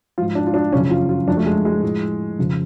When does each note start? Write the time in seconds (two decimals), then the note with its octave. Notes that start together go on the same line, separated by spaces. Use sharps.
0.18 G#2 F3 F4
0.35 D4
0.47 F4
0.54 D4
0.72 F#2 C#3 F3 C#4
0.91 F4
1.09 F4
1.27 F2 D4
1.30 F3
1.37 A3
1.46 G#3
1.65 G#3
1.82 A2 F3
2.39 F2 C#3 F3